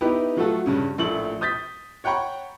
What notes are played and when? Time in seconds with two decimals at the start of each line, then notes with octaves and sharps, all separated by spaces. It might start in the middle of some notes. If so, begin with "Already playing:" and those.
0.01 B3 D#4 E4 G4 B4
0.37 F3 F#3 A3 F4 F#4 A4
0.66 G2 C#3 C#4
0.98 A#1 A2 F3 A3 A4 F#7
1.41 D#6 G6 A6 B6
2.04 C#5 F#5 G5 A#5 B5 C#6